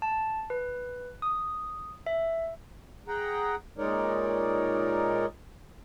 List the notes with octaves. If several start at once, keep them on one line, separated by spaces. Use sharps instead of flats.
A5
B4
D#6
E5
G#4 F#5 G5 A#5
A#2 G#3 D#4 A#4 C#5 D5